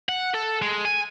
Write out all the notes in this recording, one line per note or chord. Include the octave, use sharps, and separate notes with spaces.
F#5
A4
G#3
G#5